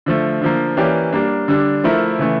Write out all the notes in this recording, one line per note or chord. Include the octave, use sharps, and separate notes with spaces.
D3 F3 A3
D3 F3 A#3
E3 A#3 C#4 G4 D5
G3 A#3 D4
D3 G3 D4
F3 A3 E4 A#4
C#3 E3 A3